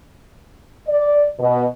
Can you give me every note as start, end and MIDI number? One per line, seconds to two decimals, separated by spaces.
0.88 1.27 74
1.39 1.65 47